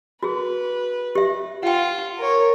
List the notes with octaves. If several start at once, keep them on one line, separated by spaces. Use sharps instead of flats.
F#4 G#4 B4
G4 E5
F4 F#5 G5
A#4 C#5